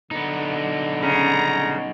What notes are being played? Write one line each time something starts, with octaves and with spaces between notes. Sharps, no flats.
D3 B3 D#4
C#3 A#5